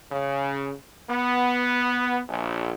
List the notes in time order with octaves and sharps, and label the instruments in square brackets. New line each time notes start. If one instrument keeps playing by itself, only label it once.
[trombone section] C#3
B3
A#1